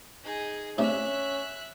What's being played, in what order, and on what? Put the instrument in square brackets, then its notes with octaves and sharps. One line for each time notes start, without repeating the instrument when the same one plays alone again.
[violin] D#4 G#4
[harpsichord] A2 C3 D4 [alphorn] C#4 [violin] E5 F#6